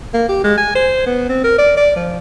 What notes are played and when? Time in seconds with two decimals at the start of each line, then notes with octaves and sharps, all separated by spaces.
0.14 A#3
0.29 G4
0.44 G#3
0.58 G#5
0.75 C5
1.06 B3
1.29 C4
1.44 A#4
1.58 D5
1.77 D5
1.96 F3